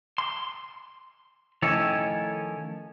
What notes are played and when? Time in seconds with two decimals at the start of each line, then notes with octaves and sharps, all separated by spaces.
0.18 C6
1.62 D#3 F3 A3 C#4 E4 C#5